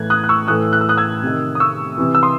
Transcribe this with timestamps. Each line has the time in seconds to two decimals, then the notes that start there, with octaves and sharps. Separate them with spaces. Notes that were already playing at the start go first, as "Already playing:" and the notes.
Already playing: A2 E3 F#6 G#6
0.10 D#6 F#6
0.24 F#6
0.29 C#6 E6
0.48 A2 E3 D#6 F#6
0.73 F#6
0.81 E6
0.89 D#6 F#6
0.97 E6 G#6
1.23 C3 D#3
1.55 D#6
1.60 C#6 E6
1.98 C3 E3
2.15 E6
2.23 C6 D#6